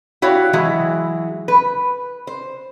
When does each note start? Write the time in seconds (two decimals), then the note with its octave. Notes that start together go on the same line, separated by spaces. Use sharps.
0.22 E4 F#4 G4 C#5 F5
0.53 E3 F#3 G#3 E4
1.48 B4
2.27 C5